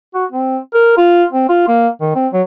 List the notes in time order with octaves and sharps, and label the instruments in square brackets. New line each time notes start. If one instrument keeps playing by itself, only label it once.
[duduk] F#4
C4
A#4
F4
C4
F4
A#3
D#3
C4
F#3